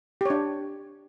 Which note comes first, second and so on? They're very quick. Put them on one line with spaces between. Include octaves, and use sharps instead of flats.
G4 C#5 D4